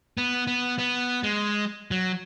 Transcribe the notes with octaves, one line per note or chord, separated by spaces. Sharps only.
B3
B3
B3
G#3
F#3